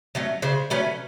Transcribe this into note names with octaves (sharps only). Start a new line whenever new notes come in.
F#3 A3 C#4
C#3 C5
F#3 A3 C#4 B4